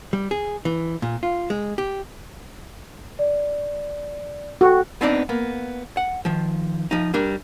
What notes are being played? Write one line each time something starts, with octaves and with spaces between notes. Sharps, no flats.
G3
G#4
E3
A#2
F4
G#3
G4
D5
F#4 A4 G5
B3 C4 D4 D#4 D5
A#3 B3
F#5
D#3 F3
F3 D#4
G3 D4 A#4